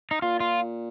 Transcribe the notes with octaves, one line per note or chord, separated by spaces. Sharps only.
D#4
A#2 F4
F4